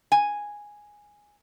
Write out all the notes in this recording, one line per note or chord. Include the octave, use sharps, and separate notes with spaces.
G#5